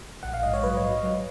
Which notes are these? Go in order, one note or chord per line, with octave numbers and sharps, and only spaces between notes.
A#1 F#5
F5
G#2 D#5
C#5
F#3 B4
C#5
F#3
F#3